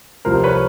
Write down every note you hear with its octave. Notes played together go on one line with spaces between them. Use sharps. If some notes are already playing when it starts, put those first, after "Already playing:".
C2 C3 F3 A#4 C5
B4 C#5